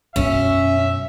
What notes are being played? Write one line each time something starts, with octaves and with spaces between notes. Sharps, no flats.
F#2 B2 C#4 E5